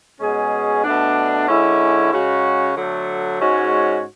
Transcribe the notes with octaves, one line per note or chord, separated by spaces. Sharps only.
B2 G#3 C#4 G#4
B2 A3 D4
D3 G#3 C#4 E4
C#3 G#3 C#4 F#4
D3 F#3 A3
G#2 G#3 C#4 F#4 C#5